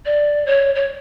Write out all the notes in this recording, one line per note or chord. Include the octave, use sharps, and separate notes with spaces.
D5
C#5
C#5